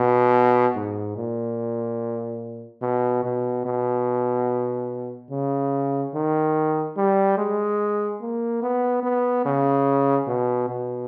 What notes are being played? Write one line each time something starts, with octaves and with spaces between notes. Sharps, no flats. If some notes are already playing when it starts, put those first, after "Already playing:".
Already playing: B2
G#2
A#2
B2
B2
B2
C#3
D#3
G3
G#3
A#3
B3
B3
C#3
B2
B2